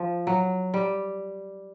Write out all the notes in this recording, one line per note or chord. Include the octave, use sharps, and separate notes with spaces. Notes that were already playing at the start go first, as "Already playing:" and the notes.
Already playing: F3
F#3
G3